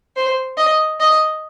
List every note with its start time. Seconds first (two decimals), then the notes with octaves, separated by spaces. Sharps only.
0.16 C5
0.58 D#5
1.01 D#5